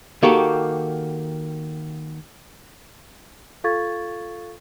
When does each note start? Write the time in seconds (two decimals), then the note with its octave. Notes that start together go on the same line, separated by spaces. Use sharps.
0.23 D#3 A#3 F#4 G4 A4
3.64 F4 A4 F5 C#6 G#6 A6